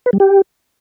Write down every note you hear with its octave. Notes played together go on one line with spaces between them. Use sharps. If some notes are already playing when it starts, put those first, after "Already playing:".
B4
G3
G4